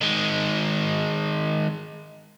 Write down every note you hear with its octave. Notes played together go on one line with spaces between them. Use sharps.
D#3 G#3